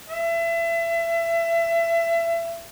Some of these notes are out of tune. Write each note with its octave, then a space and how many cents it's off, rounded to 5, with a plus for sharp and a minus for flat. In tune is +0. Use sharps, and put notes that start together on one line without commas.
E5 +30